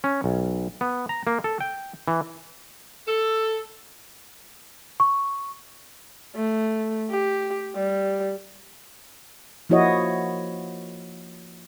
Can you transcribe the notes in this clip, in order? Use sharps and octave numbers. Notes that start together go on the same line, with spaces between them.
C#4
B1
B3
A#5
A#3
A4
G5
E3
A4
C#6
A3
G4
G3
F3 A#3 E4 F#4 C#5 D#5